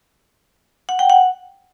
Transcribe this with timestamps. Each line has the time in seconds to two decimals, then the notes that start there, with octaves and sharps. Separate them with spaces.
0.89 F#5
0.99 G5
1.10 F#5